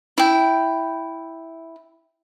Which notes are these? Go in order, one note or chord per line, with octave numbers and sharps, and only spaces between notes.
E4 G5